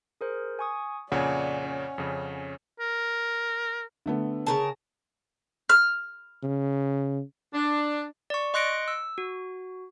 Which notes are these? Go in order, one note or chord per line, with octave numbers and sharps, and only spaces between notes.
G#4 A#4 C5
G#5 C#6 D#6
F2 A#2 C#3 C#5 D5 F#5 G#5
C#4
F2 C#3
A#4
D3 A3 B3
C#3 A#4 A5
F6
C#3
D4
D5 C#6
D#5 C6 F#6 A#6 C#7 D7
E6
F#4